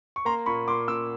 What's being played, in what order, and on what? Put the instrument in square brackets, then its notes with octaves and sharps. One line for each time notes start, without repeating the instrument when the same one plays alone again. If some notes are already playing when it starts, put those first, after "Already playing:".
[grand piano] C#6
A#3 A#5 C6
A#2 B5 C#6
A#2 C6 D6
A#2 D6 E6